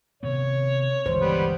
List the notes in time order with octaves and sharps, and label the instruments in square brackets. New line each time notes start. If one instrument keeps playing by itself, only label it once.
[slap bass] C3 D#3 B3 [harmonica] C#5
[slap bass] G1 C#2 G#2 [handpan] E3 C5
[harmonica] G3 B3